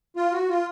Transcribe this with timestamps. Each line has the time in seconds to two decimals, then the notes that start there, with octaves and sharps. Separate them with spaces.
0.16 F4
0.32 F#4
0.49 F4